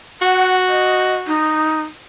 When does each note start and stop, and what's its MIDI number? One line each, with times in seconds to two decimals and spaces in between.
0.22 1.37 66
0.22 0.53 78
0.69 1.15 75
1.27 1.82 63